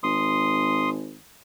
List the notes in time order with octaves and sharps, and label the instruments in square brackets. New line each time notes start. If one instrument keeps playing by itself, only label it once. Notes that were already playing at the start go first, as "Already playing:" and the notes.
[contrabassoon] G#1 [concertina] C6 D#6